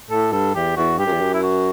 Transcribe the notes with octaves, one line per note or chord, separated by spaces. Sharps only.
A2 A4
G2 A4
E2 G4
E2 F#4
G2 G4
F#2
E2
F#2
E4
F#4